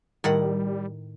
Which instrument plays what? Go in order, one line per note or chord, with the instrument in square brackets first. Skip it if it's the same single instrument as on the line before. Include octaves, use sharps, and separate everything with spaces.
[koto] A2 D#3 F#5 [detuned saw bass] G3